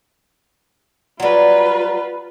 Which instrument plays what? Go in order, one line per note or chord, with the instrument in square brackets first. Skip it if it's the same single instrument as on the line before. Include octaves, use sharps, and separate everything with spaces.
[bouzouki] F#3 G3 [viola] F4 B4